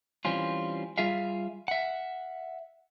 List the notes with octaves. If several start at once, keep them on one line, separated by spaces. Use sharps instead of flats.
E3 G3 C4 C#4 F4
G3 F4 G#4 E5 F5
E5 F#5